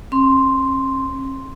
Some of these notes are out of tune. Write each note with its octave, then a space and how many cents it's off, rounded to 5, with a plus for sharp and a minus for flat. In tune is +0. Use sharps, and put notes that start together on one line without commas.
C#4 -45 C6 +0